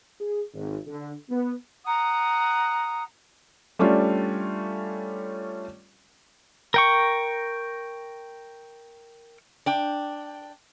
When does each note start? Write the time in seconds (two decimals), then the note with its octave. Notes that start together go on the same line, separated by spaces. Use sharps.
0.20 G#4
0.54 G#1
0.87 D3
1.29 B3
1.85 F#5 A#5 D#6
3.79 G3 A3 C#4 D4 F4
6.74 A#4 G5 C#6
9.66 D4 G5